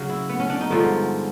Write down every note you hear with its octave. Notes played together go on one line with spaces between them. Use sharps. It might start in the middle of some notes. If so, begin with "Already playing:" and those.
Already playing: C#3 F#3
E4
B3
C#4
D4
D#4
G2 D3 F3 G#3